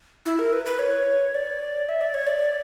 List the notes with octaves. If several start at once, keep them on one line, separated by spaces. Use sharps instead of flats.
E4
A#4
B4
B4
C#5
D5
E5
D5
C#5
D5